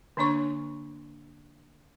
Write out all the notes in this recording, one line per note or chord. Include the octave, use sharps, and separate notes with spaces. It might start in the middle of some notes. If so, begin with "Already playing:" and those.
D3 A#3 D4 C#5 C#6